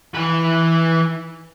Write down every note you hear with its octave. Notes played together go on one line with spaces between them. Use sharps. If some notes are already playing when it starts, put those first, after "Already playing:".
E3 B4